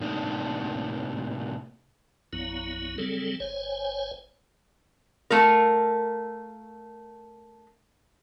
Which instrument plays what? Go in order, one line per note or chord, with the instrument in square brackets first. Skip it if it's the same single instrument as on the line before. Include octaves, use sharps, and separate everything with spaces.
[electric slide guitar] A2 C3 A#3 D4 D#4
[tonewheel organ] A#1 F#2 F#3 B3 E4
C#3 F#3 G3 C4 G#4 A4
G1 C5 C#5 G#5
[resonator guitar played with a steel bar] A3 F4 A#4